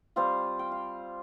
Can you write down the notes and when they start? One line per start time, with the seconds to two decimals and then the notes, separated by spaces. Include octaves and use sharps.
0.16 G3 C4 F4 F5
0.59 G5
0.72 F5